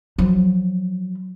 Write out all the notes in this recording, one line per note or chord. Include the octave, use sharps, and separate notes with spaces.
F3 F#3